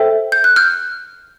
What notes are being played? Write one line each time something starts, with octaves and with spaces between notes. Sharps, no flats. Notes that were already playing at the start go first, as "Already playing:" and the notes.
Already playing: A4 C5 E5 G5
G6
F#6
F6 G6